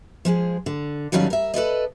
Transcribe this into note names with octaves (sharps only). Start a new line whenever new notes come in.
F3 G#3 G#4
D3
A2 D#3 F#3 G3 C#4 F5
A#4 E5
A4 B4 D5 D#5